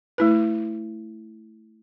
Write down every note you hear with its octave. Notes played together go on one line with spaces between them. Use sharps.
A3 E4 B4